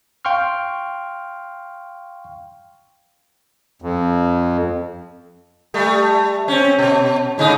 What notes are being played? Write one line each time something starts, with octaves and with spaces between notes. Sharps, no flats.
F5 G5 C6 C#6 F6
F2
G3 A3
C4 C#4
B2
A2 C#3 D#4